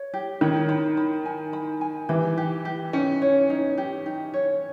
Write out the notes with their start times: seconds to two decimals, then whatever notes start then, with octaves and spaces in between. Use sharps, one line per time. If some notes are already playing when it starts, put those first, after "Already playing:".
Already playing: C#5
0.14 G4
0.41 D#3 C#5
0.69 B5
0.97 B5
1.25 G#5
1.53 B5
1.81 G#5
2.09 E3 G4
2.37 G4
2.65 G4
2.93 C#4 D#4
3.22 C#5
3.50 D#4
3.78 G4
4.06 D#4
4.34 C#5